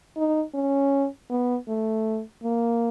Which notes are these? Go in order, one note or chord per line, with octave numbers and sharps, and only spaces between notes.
D#4
C#4
B3
A3
A#3